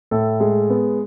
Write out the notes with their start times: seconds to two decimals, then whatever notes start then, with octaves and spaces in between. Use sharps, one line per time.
0.11 A2 A4
0.40 G#3
0.70 B3